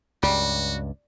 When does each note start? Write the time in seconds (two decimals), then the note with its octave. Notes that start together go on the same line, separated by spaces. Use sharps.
0.23 C#2 G2 G3 F#4